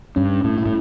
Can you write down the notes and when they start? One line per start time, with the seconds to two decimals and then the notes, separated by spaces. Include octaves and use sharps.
0.16 G2 C#4
0.44 A2
0.58 E4
0.66 A2